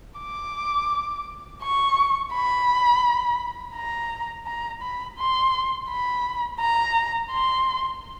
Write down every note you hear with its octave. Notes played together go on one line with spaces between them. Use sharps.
D6
C#6
B5
A#5
A#5
B5
C6
B5
A#5
C6